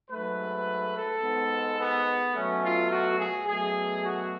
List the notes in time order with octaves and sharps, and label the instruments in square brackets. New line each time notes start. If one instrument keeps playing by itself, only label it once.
[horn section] G#2 F#3 A3 B4
A4
G#2 G#3 B3
B3
B2 F#3 A3 C#4
F4
F#4
G#4
B2 F#3 A3 G#4
F#4